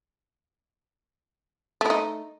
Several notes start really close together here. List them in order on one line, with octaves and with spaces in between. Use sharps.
A3 E4 D#4